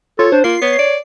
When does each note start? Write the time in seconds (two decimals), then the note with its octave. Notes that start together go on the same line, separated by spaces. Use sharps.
0.19 F4 A4 C#5
0.32 D4 C5
0.44 A#3 F4 C7
0.61 B3 C#5
0.79 D5